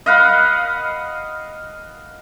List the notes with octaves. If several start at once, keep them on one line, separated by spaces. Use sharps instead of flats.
D#5 F5 F#5 B5